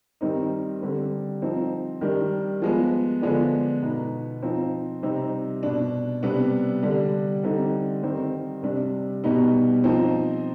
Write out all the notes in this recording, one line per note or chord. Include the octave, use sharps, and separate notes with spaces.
D#3 G3 C4 D#4
D3 G3 C4
F3 C4 D#4
D#3 G3 D4
F3 G#3 B3
D3 F3 G#3 B3 D4
B2 B3 D#4
F3 C4 D#4
C3 G3 C4 D#4
B2 B3 D4
C3 G3 B3 D4
D3 G3 D4
D3 G3 C4 D#4
D#3 G3 C4 D#4
C3 G3 D4
B2 G3 B3 D#4
F3 C4 D#4